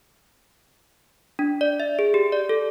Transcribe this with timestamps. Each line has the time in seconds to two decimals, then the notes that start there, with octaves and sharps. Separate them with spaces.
1.39 D4
1.61 D5
1.80 E5
1.99 G#4
2.14 G4
2.32 D5
2.49 A4